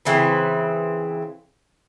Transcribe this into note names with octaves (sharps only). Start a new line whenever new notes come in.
C#3 E3 C4 B4